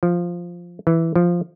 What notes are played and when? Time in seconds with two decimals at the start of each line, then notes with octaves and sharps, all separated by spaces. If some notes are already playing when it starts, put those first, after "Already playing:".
0.03 F3
0.87 E3
1.15 F3